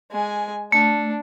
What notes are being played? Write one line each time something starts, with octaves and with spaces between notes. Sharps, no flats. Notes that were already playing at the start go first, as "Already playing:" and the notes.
G#3 G#5
A3 D4